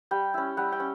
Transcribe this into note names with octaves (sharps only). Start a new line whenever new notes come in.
G3 G5
C#4 E4
G3 F#5
G5
C#4